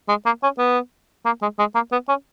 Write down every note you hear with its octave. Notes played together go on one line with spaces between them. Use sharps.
G#3
A#3
C#4
B3
A#3
G#3
G#3
A#3
B3
C#4